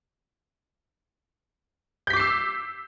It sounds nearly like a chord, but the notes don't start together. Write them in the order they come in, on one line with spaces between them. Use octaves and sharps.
G6 B6 D6 C7 E6